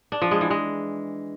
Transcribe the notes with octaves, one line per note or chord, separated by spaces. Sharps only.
D4
F3
G#3
E3
G#3